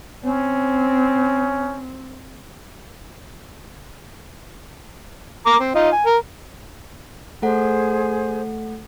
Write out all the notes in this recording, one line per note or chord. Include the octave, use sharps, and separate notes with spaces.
C4 C#4
A#4 A#5 D6
C4
D#4 F4 D#5
G#5
A#4
A3 G#4 A4 C5 F#5 G#5